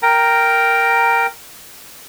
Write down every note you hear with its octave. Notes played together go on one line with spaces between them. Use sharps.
A#4 G5 A#5